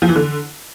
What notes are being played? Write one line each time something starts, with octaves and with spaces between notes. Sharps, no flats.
F3
E3
D3